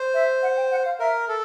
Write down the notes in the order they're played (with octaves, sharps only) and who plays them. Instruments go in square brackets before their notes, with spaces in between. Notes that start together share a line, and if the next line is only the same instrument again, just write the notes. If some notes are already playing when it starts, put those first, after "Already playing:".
Already playing: [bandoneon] C5
[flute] E5
F#5
G5
F#5
F5
[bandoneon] A#4 [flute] E5
[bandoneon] A4 [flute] A5